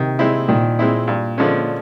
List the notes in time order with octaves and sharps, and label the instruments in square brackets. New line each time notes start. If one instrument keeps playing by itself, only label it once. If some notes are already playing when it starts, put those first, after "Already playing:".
Already playing: [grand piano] C3 [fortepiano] D#3
[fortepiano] G#3 C4 E4
[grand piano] A#2 [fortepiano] D#3
[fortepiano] G#3 C4 E4
G2
D3 F3 G#3 C#4